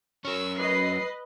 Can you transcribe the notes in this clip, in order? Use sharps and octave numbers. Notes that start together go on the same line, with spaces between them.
F#3 C#4 C#6 E6
B4 D#5 C7